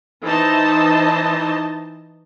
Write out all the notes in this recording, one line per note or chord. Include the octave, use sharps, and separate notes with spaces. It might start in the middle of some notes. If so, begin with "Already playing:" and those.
E3 D#4 C5 D#5 A5